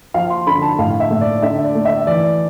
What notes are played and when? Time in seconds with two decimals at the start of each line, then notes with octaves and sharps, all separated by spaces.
0.14 F3 F5
0.30 C6
0.47 D3 B5
0.62 A5
0.79 A2 F5
1.00 E5
1.11 A2
1.21 D5
1.42 D3 E5
1.64 D5
1.75 A3
1.85 E5
2.07 E3 D5